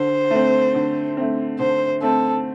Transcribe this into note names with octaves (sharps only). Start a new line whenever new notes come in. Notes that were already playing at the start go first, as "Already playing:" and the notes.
Already playing: D3 C5
A3 C4
D3
A3 C4
D3 C5
A3 C4 A4